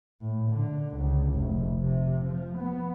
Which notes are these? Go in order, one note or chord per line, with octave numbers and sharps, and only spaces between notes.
A2
D3
C#2
F1
C3
F3
B3